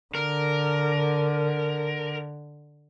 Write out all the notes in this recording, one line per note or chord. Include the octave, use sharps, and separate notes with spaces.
D3 A#4